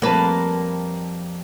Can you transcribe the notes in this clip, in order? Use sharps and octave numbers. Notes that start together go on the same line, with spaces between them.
F2 G3 A#3 B4 A5